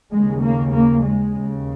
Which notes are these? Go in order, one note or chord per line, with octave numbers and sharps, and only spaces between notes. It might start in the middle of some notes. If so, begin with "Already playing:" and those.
D#2 C#3 G#3
A#3
A#3
G#3
D#2 C#3